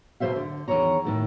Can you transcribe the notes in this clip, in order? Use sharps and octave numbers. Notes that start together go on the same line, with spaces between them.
D#2 B2 F3 C5 E5 F5
D3
E2 G2 D#3 C#5 A#5
A2 D#3 A3